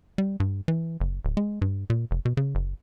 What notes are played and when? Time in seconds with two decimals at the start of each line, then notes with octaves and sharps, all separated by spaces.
0.18 G3
0.40 G2
0.68 E3
1.00 F#1
1.25 D1
1.37 G#3
1.62 G2
1.90 A#2
2.11 F1
2.25 B2
2.37 C#3
2.55 F#1